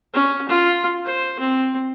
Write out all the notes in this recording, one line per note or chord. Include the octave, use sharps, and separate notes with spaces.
C#4
F4
C5
C4